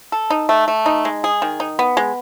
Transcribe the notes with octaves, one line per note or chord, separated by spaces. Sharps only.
A4
D#4
A3
A3
D#4
G#3
G#4
D#3
D#4
B3
G#3